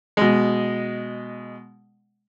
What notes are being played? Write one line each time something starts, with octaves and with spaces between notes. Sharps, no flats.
B2 G#3